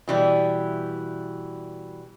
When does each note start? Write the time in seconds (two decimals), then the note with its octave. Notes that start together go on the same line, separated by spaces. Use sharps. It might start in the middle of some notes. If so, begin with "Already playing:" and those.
0.08 B2 E3 G3